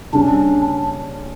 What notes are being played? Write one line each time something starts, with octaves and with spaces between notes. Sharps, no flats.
C#3 G3 C#4 D4